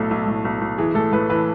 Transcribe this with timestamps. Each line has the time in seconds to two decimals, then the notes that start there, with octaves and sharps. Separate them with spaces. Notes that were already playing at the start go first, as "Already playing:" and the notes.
Already playing: B1 A2 A4
0.11 B1
0.27 A2
0.45 B1
0.61 B1
0.78 E3 G#4
0.95 A2 A4
1.12 A2 B4
1.30 E3 B4